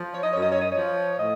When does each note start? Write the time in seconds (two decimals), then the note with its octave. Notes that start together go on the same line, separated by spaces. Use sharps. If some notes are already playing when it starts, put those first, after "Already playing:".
Already playing: F3
0.14 C#5
0.23 D#5
0.33 F#2 C#5
0.43 D#5
0.52 C#5
0.62 D#5
0.72 F3 C#5
1.18 A2 D#5